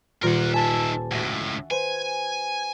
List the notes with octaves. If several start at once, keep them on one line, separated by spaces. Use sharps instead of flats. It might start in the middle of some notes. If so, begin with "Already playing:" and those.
D#1 F4 A#4 F#5 G6
D#3 E5 G#5 A5 G#6
C#2 A2 F#4 E5 F#5
B4 C5 G#5